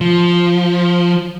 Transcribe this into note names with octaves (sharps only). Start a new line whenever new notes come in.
F3